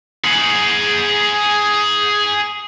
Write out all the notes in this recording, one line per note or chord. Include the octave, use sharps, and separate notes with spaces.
G#4 F#5